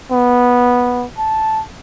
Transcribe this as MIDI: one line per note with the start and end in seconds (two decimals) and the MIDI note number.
0.11 1.06 59
1.18 1.62 81